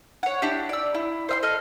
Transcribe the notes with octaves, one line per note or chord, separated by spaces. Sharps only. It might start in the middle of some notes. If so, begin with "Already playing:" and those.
C#5 F#5
D4 E4 G4
D5 E6
E4
C5 E5 C6
A4 D#5 F6